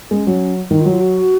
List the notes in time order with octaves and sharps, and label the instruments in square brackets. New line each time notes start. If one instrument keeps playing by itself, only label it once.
[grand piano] G#3 [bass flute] C#4
[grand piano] F#3
[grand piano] D#3 [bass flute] D#4
[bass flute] F4
[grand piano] F#3
[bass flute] F4
F#4